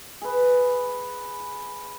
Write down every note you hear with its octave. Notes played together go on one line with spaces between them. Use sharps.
G#4 B4